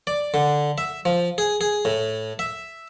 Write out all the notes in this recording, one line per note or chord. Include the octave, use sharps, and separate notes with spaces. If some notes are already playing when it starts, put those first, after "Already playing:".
D5
D3
E5
F3
G#4
G#4
A2
E5